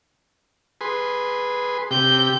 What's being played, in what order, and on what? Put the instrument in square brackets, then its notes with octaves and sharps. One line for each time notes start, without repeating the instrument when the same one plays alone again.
[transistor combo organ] G#4 B4 C6
[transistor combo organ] C3 G4 [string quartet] G6